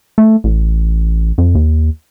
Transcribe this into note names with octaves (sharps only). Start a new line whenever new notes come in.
A3
A1
F2
D#2